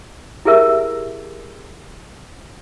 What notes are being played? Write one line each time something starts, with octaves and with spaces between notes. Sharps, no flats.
E4 G4 G#4 A#4 E5 E6